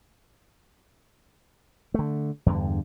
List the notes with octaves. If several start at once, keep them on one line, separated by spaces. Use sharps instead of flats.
D3 A3
E2 G2 D3